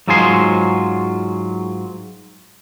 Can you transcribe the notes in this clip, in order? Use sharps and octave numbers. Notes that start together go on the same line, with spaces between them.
G#2 F#3 F4 G#4 G#5 C6